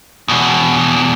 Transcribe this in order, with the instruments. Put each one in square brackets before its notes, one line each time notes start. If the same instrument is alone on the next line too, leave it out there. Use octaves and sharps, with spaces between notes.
[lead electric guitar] E2 B2